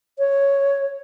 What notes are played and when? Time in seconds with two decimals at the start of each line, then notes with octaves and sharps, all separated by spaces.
0.19 C#5